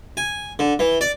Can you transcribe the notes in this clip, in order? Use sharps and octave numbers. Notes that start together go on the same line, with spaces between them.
G#5
D3
E3
D5